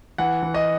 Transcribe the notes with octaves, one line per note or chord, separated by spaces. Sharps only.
E3 F#5
E3
D#5